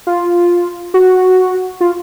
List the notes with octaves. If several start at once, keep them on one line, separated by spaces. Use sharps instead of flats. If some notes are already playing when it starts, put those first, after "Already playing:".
F4
F#4
F4